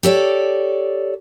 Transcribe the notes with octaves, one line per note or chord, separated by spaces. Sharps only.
G4 A4 C#5 D5